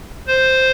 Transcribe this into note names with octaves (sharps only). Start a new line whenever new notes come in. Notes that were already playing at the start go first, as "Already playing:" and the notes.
C5